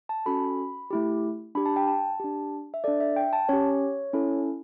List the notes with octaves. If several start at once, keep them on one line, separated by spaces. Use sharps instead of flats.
A5
C#4 F#4 A4 B5
A3 E4 G4
D4 G4 B5
A5
G5
A5
D4 G4
E5
D4 A4 D5
E5
G5
A5
C#4 G4 C#5
C#4 E4 A4